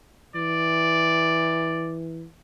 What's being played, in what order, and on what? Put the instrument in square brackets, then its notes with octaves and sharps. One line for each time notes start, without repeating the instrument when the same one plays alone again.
[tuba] E3 [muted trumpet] D5